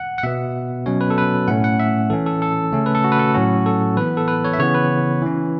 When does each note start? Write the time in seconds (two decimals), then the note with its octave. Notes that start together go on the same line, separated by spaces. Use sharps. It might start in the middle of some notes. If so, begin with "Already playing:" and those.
Already playing: F#5
0.18 F#5
0.23 B2 B3 E5
0.86 B2 F#3 C#4 C#5
1.01 B4
1.10 A4
1.18 B4
1.48 A2 A3 C#4 F#5
1.64 F#5
1.80 E5
2.10 E3 C#4 A4
2.26 A4
2.42 A4
2.73 C#3 A3 C#4
2.86 B4
2.95 A4
3.04 F#4
3.12 B4
3.19 A4
3.34 A2 F#3 C#4 F#4
3.66 A4
3.97 E3 B3 B4
4.17 A4
4.28 B4
4.45 C#5
4.53 E5
4.59 C#3 E3 B3 C#5
4.75 B4
5.22 E3 C#4